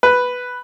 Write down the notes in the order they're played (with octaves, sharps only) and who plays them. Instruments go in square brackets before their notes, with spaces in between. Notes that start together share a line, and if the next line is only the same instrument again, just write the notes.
[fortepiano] B4